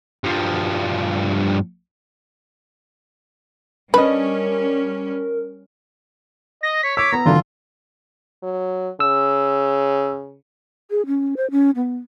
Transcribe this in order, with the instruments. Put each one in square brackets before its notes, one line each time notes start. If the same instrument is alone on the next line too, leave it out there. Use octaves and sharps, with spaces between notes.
[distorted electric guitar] G2 F3
[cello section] G3 C#4 [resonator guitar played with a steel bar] D4 D#5 [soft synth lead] A#4 [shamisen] B4
[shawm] D#5 [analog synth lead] A#6
[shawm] C#5 [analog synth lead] B6
[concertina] C#5 [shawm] D6 [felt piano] E6
[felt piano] B3 [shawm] A#5
[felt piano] G#1 D3 F#3 [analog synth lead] E3 [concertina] F4
[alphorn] F#3
[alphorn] C#3 [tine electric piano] E6
[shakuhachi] G#4
C#4
C5
C#4
B3